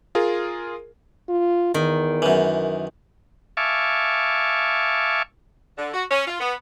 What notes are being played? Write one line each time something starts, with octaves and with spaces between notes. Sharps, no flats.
F4 G#4 A#4
F4
E2 D#3
F#2 E3
E5 F5 G#5 A5 C#6 D6
D3
F#4
C#4
F4
B3